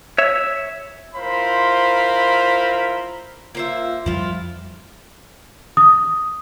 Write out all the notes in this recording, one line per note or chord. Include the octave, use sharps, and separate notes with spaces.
C#5 E5
E4 F4 A#4 C5 F5 B5
A#3 F4 C5 E5
F2 F3 G3 E4 F4
D#6